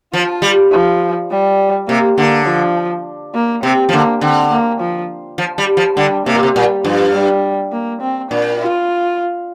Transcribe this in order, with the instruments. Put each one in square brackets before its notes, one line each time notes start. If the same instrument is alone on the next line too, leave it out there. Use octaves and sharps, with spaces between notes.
[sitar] F3 [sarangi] F4
[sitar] G3
[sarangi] F3
G3
[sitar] C3 [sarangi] A#3
[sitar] D3 [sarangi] A#3
[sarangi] F3
A#3
[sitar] C3 [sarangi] C4
[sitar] F3
[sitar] D3 [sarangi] A#3
[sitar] D3 [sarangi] C4
[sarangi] A#3
F3
[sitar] F3
G3
F3
[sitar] D3 [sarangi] G3
[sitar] C3 [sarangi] A#3
[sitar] A#2
C3
[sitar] A#2 [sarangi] G3
[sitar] G2 [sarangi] F3
[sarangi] G3
A#3
C4
[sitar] A#2 [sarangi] D4
[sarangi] F4